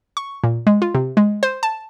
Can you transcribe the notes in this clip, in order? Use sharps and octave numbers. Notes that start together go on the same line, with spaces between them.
C#6
A#2
G#3
F4
C3
G#3
C5
A5